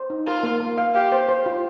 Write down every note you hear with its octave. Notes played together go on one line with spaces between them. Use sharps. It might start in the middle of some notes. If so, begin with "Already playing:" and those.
Already playing: C5
D#4
F4 A#4
A#3
A#3
F5
G4 F5
C5
C5
F4